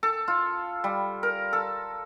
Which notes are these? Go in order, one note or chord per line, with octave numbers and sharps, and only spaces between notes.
A4
F4
G3
A#4
A4